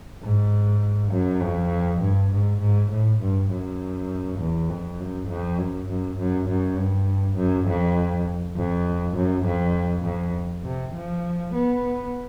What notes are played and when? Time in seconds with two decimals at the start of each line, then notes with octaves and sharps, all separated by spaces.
0.23 G#2
1.12 F#2
1.42 F2
2.01 G2
2.32 G#2
2.61 G#2
2.91 A2
3.21 G2
3.50 F#2
4.39 E2
4.69 F2
4.99 F#2
5.28 F2
5.58 F#2
5.89 F#2
6.18 F#2
6.48 F#2
6.78 G2
7.37 F#2
7.67 F2
8.57 F2
9.16 F#2
9.45 F2
10.05 F2
10.64 C3
10.95 F3
11.54 B3